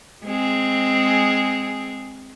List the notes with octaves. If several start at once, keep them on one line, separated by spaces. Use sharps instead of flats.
G#3 C4 G#4